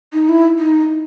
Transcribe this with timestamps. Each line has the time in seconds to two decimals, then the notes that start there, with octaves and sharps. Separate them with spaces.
0.13 D#4
0.28 E4
0.58 D#4